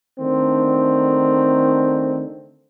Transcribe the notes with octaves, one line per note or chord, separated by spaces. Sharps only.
D3 D#3 A3 C4